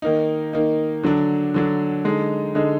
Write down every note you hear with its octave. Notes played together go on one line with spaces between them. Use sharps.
D#3 A#3 D#4
D#3 A#3 D#4
D3 F#3 D4
D3 F#3 D4
D3 G#3 D#4
D3 G#3 D#4